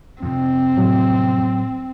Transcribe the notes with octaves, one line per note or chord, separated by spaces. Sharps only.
F2 C3 C4
A2 F#3